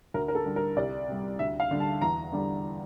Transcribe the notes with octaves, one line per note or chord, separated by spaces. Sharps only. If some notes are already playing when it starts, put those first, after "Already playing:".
D2 A#4
A#4
A4
D3 G3
A#4
C2 D5
C3 G3
D2 E5
F5
D3 G3
A5
E2 A#5
D3 G3